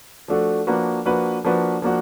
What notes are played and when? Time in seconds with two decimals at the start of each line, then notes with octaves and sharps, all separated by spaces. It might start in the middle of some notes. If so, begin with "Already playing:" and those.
0.28 F3 A3 D4 F#4 A4
0.67 F3 A#3 D4 F#4 B4
1.05 F3 A#3 D4 F#4 B4
1.44 F3 A#3 D4 F#4 B4
1.82 F3 A#3 D4 F#4